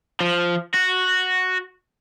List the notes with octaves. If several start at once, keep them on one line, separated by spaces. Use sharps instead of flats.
F3
F#4